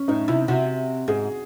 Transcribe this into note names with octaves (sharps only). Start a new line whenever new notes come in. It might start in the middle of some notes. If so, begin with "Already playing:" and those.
Already playing: C#4
A2 D#4
C3 E4
C3 F#4
G#2 G#4